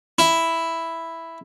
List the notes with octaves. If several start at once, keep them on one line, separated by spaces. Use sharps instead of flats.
E4